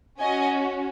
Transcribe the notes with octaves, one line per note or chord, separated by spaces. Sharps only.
C#4 F#4 D#5 G#5